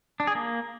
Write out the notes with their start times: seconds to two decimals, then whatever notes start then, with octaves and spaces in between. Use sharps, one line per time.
0.20 D4
0.27 G#4
0.35 A#3